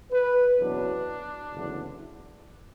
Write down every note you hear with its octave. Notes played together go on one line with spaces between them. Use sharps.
B4
F#1 E2 B2 F#3 D4
F#1 E2 D3